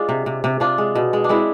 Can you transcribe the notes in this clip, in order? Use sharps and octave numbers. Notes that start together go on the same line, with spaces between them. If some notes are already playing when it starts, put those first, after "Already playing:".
Already playing: G#3 D4 F4
C3
C3
C3
C3 D4 F4
G#3
B2
G#3
D4
G#3 C4 E4